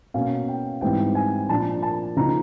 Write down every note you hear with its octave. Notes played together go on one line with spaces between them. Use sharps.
B2 F#3 A#3 C#4 F5
G5
G#2 E3 G3 C4 G5
G#5
A#2 F3 A#3 D4 A5
A5
C#3 F3 A#3 D#4 A#5